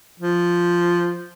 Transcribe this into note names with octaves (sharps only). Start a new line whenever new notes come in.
F3